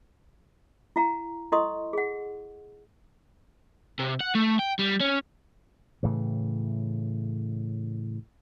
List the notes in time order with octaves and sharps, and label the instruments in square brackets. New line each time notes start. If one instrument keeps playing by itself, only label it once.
[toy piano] E4 F5 A#5
E4 A4 D#5 C6 C#6 D#6
G#4 F#5
[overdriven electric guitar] C3
F#5
A3
G5
G3
C#4
[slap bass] A2 C#3 E3